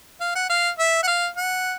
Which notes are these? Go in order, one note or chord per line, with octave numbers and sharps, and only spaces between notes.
F5
F#5
F5
E5
F#5
F5
F#5